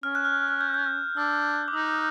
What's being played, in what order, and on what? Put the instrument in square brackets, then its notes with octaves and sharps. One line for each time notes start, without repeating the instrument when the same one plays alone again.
[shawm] C#4 [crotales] F6
[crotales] F#6
F6
F#6
G6
G6
[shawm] D4 [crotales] E6
[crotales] D6
[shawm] D#4 [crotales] D#6